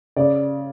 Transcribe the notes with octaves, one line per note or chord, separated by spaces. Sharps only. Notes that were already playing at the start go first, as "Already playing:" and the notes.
C#3 D5